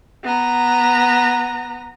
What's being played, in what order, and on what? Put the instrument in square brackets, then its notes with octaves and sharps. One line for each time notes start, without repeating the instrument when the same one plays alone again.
[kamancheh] B3 A#5